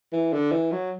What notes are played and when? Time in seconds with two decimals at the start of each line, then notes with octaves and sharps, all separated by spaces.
0.12 E3
0.33 D3
0.52 E3
0.72 F#3